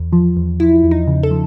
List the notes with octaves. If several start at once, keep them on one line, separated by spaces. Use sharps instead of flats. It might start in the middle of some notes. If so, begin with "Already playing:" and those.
Already playing: E2
F3
E2
F3 E4
E2
D#4
C#3
A4
F3